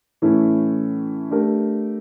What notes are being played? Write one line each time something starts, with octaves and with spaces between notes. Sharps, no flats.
A2 E3 A3 C#4 E4
A3 D4 G4 A#4